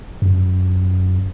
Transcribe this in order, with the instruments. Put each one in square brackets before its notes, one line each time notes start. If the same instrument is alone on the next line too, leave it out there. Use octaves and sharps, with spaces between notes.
[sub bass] F#2